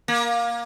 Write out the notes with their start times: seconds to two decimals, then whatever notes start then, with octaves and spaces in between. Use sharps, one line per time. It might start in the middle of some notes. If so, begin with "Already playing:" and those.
0.08 A#3